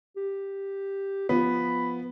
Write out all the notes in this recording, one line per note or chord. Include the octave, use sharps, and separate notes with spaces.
G4
F3 B3 B5